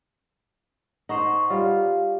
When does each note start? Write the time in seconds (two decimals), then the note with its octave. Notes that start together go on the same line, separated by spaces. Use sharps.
1.09 D#4 C5 F#5 C#6
1.50 G3 F4 F5